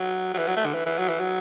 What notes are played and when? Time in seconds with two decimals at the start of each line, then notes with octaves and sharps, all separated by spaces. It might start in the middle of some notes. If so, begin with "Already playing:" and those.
Already playing: F#3
0.34 F#3
0.38 E3
0.47 F#3
0.57 A3
0.65 D3
0.74 E3
0.86 E3
0.99 F#3
1.09 E3
1.20 F#3